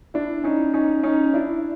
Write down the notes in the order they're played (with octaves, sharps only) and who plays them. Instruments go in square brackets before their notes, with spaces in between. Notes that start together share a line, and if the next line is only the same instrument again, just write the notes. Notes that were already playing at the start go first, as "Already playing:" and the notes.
[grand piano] D4 E4
C#4 D#4
C#4 D#4
C#4 D#4
D4 E4